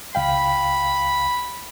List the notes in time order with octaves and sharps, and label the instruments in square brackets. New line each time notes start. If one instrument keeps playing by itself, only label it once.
[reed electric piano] C#2 F5 G5 [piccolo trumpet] B5